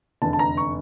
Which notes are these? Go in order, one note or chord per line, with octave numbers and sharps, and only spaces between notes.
F1 E2 D3 A5
A5
A#5
C#6